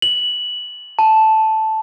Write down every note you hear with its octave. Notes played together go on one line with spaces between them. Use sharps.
F#7
A5